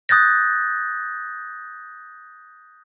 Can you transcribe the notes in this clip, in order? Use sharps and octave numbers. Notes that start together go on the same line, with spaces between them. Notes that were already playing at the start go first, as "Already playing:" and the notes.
D#6 F#6 G6 A6 A#6